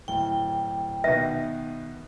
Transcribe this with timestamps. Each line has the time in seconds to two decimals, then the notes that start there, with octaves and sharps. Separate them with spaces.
0.08 D1 G5
1.04 B2 D#3 B3 E5